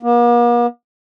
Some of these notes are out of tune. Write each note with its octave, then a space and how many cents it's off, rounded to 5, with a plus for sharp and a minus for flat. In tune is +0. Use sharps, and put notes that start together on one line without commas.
A#3 +45